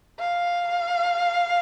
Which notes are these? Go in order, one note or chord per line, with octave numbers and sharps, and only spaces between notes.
F5